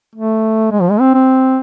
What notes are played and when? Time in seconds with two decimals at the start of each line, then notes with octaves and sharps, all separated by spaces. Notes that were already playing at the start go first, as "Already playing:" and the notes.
0.15 A3
0.71 G#3
0.81 F3
0.91 G#3
1.00 C4
1.14 C4